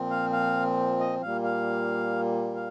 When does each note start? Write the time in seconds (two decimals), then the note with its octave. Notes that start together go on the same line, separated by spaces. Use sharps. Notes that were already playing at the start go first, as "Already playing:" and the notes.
Already playing: A#2 F3 C4
0.10 F5
0.32 F5
0.99 D#5
1.21 A#2 G3 A#3 F5
1.43 F5
2.55 F5